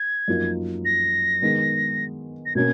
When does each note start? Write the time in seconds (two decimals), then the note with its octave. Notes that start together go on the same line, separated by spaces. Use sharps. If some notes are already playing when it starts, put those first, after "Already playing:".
Already playing: G#6
0.28 F#2 F3 A#3 D#4
0.85 A#6
1.42 D#3 G#3 B3
2.46 A#6
2.55 B2 A#3 C#4 G#6